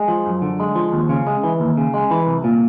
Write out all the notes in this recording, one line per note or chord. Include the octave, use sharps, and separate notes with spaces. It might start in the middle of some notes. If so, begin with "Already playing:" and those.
Already playing: G#3
F3
F#2
D3
G#3
F3
D#2
C#3
G#3
E3
D#2
C#3
G#3
E3
C2
A#2